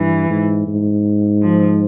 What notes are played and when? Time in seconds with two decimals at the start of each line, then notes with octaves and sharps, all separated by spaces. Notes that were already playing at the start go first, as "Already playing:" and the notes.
Already playing: G2 E3
0.30 G#2
0.67 G#2
1.42 F3